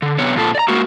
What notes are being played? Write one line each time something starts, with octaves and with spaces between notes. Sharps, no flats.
D3
C3 B3 C#5
F2 A#2 F3 A4
D5 A#5
G#3 A#3 F#4